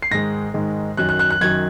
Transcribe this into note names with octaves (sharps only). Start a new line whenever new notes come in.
C7
G#2 D#3 G#3 A#6
G#2 D#3 G#3
F#2 D#3 F#3 F#6
F#6
F#6
F#6
F#2 D#3 F#3 G#6